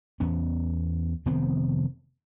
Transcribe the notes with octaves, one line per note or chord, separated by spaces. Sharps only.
E2 B3 C#4
F1 D#3 B3 C4